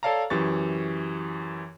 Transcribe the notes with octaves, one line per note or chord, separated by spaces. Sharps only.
A4 C#5 D5 F5 A5 A#5
F#2 E3 G4 C#6 A6